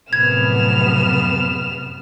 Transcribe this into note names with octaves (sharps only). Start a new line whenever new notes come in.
F#2 A2 C3 F3 B3 F6 G#6 E7